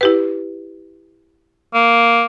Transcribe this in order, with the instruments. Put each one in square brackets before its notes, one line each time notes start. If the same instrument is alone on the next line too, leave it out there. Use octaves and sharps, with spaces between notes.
[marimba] E4 G4 B4
[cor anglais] A#3